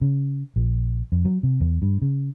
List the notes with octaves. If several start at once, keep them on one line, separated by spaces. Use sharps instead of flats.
C#3
A#1
F2
F#3
C3
E2
G2
C#3